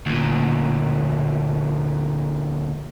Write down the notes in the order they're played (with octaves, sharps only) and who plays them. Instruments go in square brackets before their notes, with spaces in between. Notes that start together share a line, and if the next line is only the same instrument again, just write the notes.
[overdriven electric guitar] D2 A#2